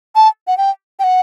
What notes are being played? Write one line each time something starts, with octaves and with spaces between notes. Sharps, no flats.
A5
F#5
G5
G5
F#5